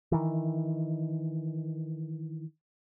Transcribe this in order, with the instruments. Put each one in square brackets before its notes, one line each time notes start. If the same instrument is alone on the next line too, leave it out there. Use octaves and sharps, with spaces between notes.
[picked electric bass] D#3 E3